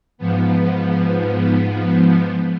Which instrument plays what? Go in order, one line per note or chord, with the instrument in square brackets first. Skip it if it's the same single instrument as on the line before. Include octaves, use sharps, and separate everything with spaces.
[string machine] G#2 F3 B3